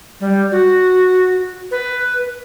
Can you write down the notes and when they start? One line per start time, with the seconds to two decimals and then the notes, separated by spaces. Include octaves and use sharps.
0.20 G3
0.52 F#4
1.71 B4